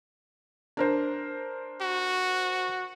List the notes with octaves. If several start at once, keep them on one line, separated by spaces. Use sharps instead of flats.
D4 A#4 C5
F#4